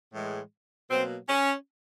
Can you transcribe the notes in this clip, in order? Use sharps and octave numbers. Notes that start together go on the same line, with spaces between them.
A2 E3 G#3
B2 F#3 A#3 C4
C#4